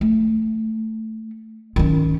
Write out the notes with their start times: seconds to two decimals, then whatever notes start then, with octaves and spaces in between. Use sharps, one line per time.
0.01 A3
1.76 D#3 C#4